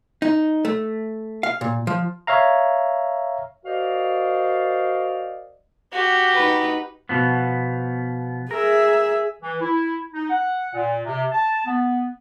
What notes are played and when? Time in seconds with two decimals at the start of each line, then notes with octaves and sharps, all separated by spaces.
0.22 D#4
0.65 A3
1.43 F5
1.61 A#2
1.87 F3
2.27 C#5 E5 F5 A#5
3.64 F#4 A#4 C5 D5 D#5 F5
5.92 F#4 G4
6.34 D#4 B4
7.09 B2 F3 B3
8.51 G#4 A#4 E5
9.41 E3
9.60 E4
10.14 D#4
10.30 F#5
10.74 A#2
11.05 C3
11.32 A5
11.66 B3